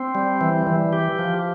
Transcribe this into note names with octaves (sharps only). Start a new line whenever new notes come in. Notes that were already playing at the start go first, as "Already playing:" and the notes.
Already playing: C4
G3
E3
E3
G4
F3